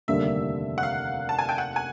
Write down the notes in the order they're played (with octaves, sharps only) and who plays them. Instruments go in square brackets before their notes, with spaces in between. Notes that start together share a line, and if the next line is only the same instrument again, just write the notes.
[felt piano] F1 D#2 D3 G3 A#3 [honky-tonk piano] E5
[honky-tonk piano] F#5
F5
A5
G#5
G5
F#5
G#5